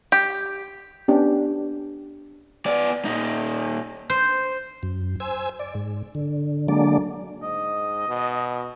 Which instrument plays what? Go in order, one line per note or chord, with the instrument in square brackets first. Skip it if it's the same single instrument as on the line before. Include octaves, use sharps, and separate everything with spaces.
[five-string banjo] G4
[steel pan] B3 C#4 D4 G4
[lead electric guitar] B3 D5
A#2 D#4
[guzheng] C5
[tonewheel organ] F#2
C5 G#5 E6
D5
G#2
D3
D3 F#3 G#3 A#3 D4 D5
[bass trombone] G#2 [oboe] D#5
[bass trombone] B2